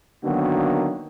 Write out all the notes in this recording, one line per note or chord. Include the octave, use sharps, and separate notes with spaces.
D3 D#3 F#3 A#3 B3 F#4